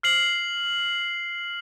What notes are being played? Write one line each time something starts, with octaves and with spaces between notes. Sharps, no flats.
F6 C7 F#7